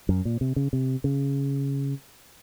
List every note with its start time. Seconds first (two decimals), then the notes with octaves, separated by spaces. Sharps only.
0.09 F#2
0.25 A#2
0.41 C3
0.56 C#3
0.73 C3
1.04 C#3